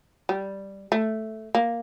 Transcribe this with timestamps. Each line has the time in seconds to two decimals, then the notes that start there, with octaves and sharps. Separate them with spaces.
0.29 G3
0.92 A3
1.55 A#3